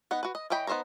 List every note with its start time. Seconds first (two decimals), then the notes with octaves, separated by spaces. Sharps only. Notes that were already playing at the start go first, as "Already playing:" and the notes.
0.11 B3 D#4 F#5
0.23 F#4 B4
0.35 D#5
0.50 E3 C#5 D#5 G5 B5
0.67 B3 D#4 C5 C#5 A#5